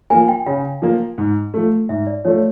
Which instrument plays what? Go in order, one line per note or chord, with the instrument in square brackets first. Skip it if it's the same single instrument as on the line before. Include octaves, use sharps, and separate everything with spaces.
[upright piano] F3 A#3 [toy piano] G#5
[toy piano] G5
[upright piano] C#3 [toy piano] F5
[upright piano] F3 A#3
G#2
F3 A3
[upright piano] G#2 [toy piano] E5
[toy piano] D5
[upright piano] F3 [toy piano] C#5
[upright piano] A3